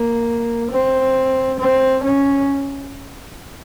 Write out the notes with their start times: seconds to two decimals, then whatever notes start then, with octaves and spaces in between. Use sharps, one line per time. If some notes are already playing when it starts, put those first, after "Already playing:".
Already playing: A#3
0.71 C4
1.60 C4
2.04 C#4